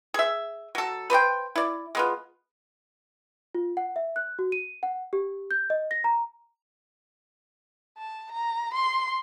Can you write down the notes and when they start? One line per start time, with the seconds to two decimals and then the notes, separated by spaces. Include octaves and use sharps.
0.14 G#4 E5
0.75 F#3 A4
1.10 B4 C5 D5 G5
1.56 E4 D5
1.95 G#3 B3 F4
3.55 F4
3.77 F#5
3.96 E5
4.16 F#6
4.39 F#4
4.52 D#7
4.83 F#5
5.13 G4
5.51 G6
5.70 D#5
5.91 A#6
6.04 A#5
7.98 A5
8.32 A#5
8.74 C6